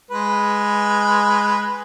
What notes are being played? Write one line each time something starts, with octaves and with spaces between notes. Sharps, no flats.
G#3 B4